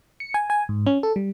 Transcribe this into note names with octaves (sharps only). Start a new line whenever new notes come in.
C#7
G#5
G#5
G#2
C#4
A4
G3